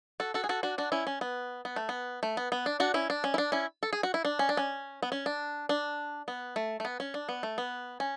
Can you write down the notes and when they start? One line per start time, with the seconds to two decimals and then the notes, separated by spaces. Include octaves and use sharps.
0.20 F#4 A4
0.34 F#4 A4
0.44 G#4
0.49 F#4 A4
0.63 D4 F#4
0.78 D4 F#4
0.92 C#4 E4
1.07 C#4
1.21 B3
1.65 B3
1.76 A3
1.89 B3
2.23 A3
2.37 B3
2.52 B3
2.66 D4
2.80 D4 F#4
2.94 C#4 E4
3.10 D4
3.24 C#4
3.34 E4
3.38 D4
3.52 C#4 E4
3.83 A4
3.93 G#4
4.03 F#4
4.14 E4
4.25 D4
4.39 C#4
4.49 D4
4.57 C#4
5.03 B3
5.12 C#4
5.26 D4
5.69 D4
6.28 B3
6.56 A3
6.80 A3
6.85 B3
7.00 C#4
7.14 D4
7.29 B3
7.43 A3
7.58 B3
8.00 C#4